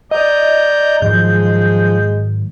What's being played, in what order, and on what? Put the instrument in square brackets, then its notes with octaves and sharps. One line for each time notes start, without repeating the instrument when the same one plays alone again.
[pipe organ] D5 A#5 G6 [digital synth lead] D#5
[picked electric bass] G#2 D#3 F#3 [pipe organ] F3 [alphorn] G#3 [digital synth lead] G6